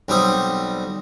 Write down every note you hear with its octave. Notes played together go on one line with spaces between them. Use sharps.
B1 G3 C4 D#6